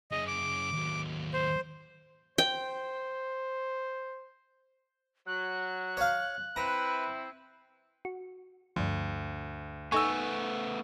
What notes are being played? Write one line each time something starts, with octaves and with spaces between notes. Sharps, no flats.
F#2 G#4 D#5
D6
D#2 F#3
C5
C5 G5
F#3 F#6
C#5 F5
C4 E4 B4 A#5
F#4
D2 G2 F3
A3 B3 D#4 A4 G#5 C#6 E6